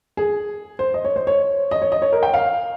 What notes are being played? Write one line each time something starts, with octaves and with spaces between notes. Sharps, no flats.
G#4
C5
D#5
C#5
C5
C#5
D#5
C#5
D#5
C#5
A#4
G5
F5